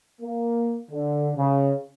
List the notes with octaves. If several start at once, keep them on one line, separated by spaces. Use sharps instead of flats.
A#3
D3
C#3